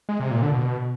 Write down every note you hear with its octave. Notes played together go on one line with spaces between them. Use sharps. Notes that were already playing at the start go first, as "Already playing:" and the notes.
G#3
C3
A#2
D3
B2